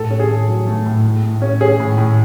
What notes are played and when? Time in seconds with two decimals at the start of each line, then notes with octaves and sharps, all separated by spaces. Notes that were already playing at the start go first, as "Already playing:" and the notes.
Already playing: A2 A4
0.11 C#4
0.20 G#4
0.29 A2
0.48 F#3
0.67 A3
0.86 A2
1.04 A2
1.23 A2
1.42 C#4
1.61 C#4 G#4
1.80 A2
1.98 A2